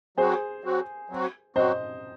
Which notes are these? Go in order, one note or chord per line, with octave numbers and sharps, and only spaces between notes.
F#3 C4 F#4 G#4 C5
F#3 C4 F#4
F#3 C4 F#4
F#3 C4 F#4 C5 D#5